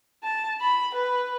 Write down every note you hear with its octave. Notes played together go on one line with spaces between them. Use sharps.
A5
B5
B4